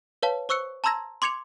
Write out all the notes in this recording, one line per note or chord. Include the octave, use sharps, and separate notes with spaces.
B4 C#5 F5 A5
C5 C#6 E6 F#6 C#7
A5 A#5 C6 E6 G#6 A#6
C6 D6 G#6 C#7 F7